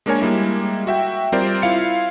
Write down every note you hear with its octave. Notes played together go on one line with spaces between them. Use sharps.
G#3 A#3 D4 A#4 C#5 G#5
G3 G#3 A#3 E4
F#4 E5 G5
G3 C4 F4 A#4 C5 D5
E4 F4 F5 C#7